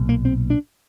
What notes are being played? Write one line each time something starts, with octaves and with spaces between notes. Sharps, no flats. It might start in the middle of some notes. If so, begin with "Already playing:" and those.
Already playing: B1 A#2
A#3
C4
D4